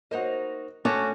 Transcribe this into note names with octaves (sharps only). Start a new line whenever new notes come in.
A#3 D#4 F#4 C5 D#5
A3 C#4 F#4 A5 D6